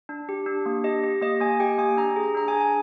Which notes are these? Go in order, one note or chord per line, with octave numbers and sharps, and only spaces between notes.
D4
G4
D4
A#3
G4 D#5
G4
A#3 D#5
A#3 G#5
G4 G5
A#3 G#5
D4 A#5
G#4
A#5
D4 A#5
G#5
G#4
G#5